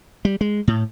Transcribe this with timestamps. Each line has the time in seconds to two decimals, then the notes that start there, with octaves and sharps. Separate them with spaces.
0.25 G3
0.41 G#3
0.68 A2